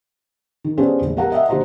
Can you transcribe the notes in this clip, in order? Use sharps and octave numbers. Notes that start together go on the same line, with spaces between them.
D#3
B3 C#4 D4 G4 G#4 C5
E1 A#1
B3 G4 A#4 F#5 A#5
D#5 E5 F#5
A#1 F#4 G4 C5 D#5 A#5